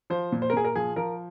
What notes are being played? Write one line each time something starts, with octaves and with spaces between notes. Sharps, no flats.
F3 C5
A#2
C5
A#4
A#2 G#4
A#4
F3 G#4
F3 A#4